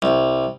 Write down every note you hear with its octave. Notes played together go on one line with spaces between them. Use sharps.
C2